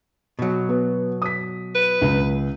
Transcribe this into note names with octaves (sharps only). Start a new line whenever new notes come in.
B2 F#3
B3
D#6 B6
B4
C#2